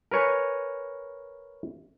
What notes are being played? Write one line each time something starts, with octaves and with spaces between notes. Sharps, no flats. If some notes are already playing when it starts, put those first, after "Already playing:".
A#4 B4 C#5 G#5